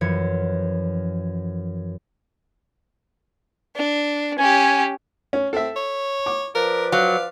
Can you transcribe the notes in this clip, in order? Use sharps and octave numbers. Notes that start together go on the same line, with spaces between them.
F#2 E3 F3 G#6 C#7
D4
C#4 G4 G#5
C#4
C4 A4 E5
C#5
D6
F3 A#4 B4 D5
F#3 F5